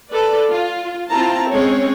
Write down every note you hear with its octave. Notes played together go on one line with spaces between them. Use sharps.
A4 B4 D5
F4
C4 E4 F4 A5 A#5
G#3 C4 C#4 C#5